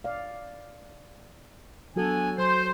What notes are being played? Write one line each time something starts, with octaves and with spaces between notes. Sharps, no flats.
D5 F5
F#3 B3 D4 F#4 A4 G#5
F#3 C5